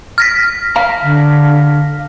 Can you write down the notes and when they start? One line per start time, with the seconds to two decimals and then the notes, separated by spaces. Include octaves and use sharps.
0.18 F6 A#6 B6
0.76 F5 A#5
1.02 D3